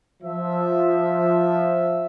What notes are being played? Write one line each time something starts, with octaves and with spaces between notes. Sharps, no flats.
F3 E5